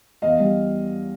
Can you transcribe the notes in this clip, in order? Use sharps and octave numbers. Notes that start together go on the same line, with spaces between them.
E2 D#5 F5
G3